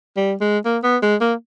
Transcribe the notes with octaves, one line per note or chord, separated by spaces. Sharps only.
G3
G#3
A#3
B3
G#3
A#3